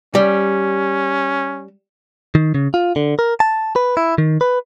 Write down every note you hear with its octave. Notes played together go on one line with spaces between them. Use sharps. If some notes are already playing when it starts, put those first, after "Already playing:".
G3 C#4
D#3
C#3
F4
D3
A#4
A5
B4
E4
D#3
B4